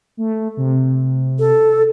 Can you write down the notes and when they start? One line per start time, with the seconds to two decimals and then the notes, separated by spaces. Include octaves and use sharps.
0.17 A3
0.57 C3
1.39 A4